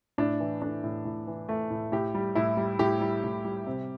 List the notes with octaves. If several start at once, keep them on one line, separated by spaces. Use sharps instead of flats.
A2 D4
E3
A3 D4
A2
A2
E3
A3
A2
A2 G4
G3
A2 E4
G3
A2 G4
G3
A2
G3
C3